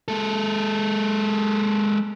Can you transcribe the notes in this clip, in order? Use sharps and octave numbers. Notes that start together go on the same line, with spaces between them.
G#3 A4